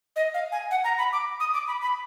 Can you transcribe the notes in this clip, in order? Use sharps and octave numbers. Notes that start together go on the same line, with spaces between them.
D#5
F5
G#5
F#5
A#5
B5
D6
D#6
D6
B5
B5